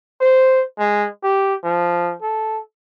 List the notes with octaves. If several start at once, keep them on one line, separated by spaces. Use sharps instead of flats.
C5
G#3
G4
F3
A4